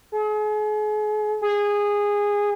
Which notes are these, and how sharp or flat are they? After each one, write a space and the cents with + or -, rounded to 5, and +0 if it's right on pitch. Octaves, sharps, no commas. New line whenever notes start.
G#4 +40
G#4 -15